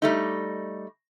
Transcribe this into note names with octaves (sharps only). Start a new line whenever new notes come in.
G3 A3 D#4